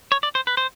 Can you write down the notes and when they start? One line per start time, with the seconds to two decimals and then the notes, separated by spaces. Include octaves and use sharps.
0.12 C#5
0.23 D5
0.35 C5
0.47 B4
0.57 C5